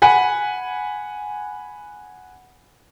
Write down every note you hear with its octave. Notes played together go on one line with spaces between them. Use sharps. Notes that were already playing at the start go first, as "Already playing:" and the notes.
F#5 G#5 B5